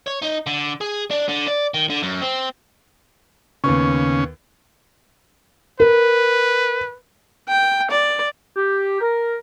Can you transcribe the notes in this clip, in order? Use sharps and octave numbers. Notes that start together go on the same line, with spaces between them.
C#5
D#4
D3
G#4
D4
D3
D5
D#3
D3
F#2
C4
D#2 C#3 B3 C#4 C#6
A#4 B4
G5
D5
G4
A#4